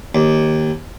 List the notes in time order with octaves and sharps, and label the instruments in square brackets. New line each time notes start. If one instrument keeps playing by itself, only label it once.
[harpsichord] D#2